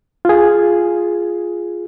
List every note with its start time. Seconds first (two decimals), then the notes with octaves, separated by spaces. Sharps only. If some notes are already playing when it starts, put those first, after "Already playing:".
0.25 F4 G#4